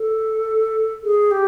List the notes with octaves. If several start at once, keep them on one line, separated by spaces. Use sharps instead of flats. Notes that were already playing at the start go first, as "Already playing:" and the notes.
Already playing: A4
G#4
G4